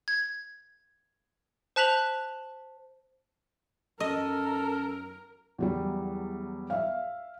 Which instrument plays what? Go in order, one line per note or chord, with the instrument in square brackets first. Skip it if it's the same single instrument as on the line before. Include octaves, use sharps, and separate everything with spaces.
[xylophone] G#6
C5 A5 F#6 B6 F7 F#7
[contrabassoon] F#2 [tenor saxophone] A4 [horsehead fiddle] A#4 [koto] D#5
[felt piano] E2 F#3 G3
E5 F5